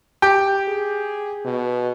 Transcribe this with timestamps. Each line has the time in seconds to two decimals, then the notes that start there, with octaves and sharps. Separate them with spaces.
0.22 G4 G5
0.68 G#4
1.45 B2